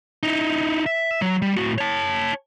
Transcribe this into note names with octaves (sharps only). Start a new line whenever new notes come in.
D#4 E4
E5
F#3
G3
A2 F#4
C#5 A5